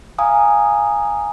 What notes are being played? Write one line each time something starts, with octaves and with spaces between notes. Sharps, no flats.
F5 G#5 A#5 D#6